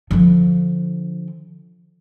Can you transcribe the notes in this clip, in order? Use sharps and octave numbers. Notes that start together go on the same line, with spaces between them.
D3 F3